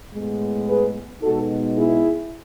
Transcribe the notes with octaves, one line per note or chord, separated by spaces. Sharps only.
A2 G#3 B3
G#4 B4
B2 G#3 B3 D#4 F#4 A4
E4 G#4